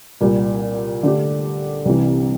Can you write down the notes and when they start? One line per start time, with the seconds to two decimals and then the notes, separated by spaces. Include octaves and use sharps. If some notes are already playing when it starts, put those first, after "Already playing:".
0.21 C2 A#2 G3
1.03 D3 A3 D4 G4
1.85 C2 C3 E3